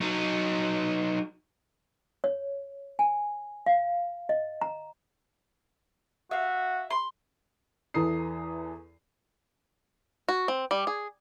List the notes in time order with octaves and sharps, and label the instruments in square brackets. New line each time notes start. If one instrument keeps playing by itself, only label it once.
[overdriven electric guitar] F#3 D#4
[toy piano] C#5
G#5
F5
D#5
A#5
[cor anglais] F#4 [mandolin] E5 F5
[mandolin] C6
[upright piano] E2 E3 A4 A#5 D#6 C7
[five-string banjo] F#4
C4
G3
G#4